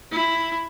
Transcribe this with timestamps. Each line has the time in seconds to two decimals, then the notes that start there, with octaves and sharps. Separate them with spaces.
0.11 E4